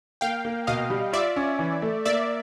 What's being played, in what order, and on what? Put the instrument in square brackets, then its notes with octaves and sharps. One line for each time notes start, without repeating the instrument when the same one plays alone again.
[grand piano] A#3 [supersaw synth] F5 G5
[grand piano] A#3
[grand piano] B2 [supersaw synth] D#5 F5
[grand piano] G3
[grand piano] F4 [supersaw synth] D5 E5
[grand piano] C#4
E3
A3
[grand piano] A#3 [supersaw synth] D5 E5